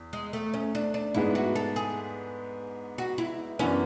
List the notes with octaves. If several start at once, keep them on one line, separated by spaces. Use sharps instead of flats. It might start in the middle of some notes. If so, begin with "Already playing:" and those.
Already playing: E2
G#3
A3
C#4
D4
D4
G#2 G#3 B3 D4 E4
F#4
A4
G#4
F#4
E4
F#2 E3 B3 C#4 D4